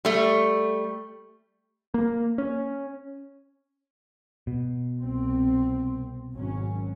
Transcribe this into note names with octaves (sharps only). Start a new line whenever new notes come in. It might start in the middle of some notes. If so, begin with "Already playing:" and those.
G3 A3
A#3
C#4
B2
C2 C4
G#1 F#3 C#4